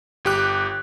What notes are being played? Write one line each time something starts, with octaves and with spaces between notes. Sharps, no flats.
G1 G4 F#6